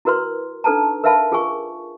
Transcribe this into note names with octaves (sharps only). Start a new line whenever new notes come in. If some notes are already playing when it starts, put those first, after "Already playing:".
E4 F#4 A#4 B4 C6
D4 D#4 A4 B4 A5 A#5
A#4 B4 E5 F5 A5 B5
F4 G#4 A#4 G#5 C#6